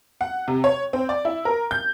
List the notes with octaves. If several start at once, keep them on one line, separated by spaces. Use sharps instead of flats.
F#5
C3
C#5
C4
D5
E4
A#4
G6